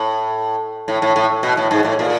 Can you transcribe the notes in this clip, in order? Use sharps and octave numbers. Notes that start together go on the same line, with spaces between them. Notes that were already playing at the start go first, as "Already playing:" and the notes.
Already playing: A2
A2
A2
A2
B2
A2
G#2
A2
A#2